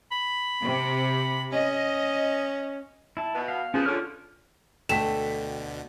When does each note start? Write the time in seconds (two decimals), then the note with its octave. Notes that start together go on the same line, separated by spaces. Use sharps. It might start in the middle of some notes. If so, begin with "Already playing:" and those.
0.11 B5
0.63 C3
1.52 C#4 D#5
3.17 E4 A5
3.35 B2 B3
3.48 F5
3.74 F3 C#4 G#4 B4
3.86 D3 C#4 F4 F6
4.89 D2 B2 D3 A3 G5 B6 E7